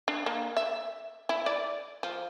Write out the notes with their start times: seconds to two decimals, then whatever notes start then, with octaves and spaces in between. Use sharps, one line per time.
0.08 D4
0.26 A#3
0.57 E5
1.29 E4
1.46 D5
2.03 F3